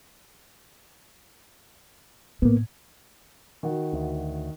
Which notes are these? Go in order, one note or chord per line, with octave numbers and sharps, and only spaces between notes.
A2 A#3 B3
D#3 F#4
D2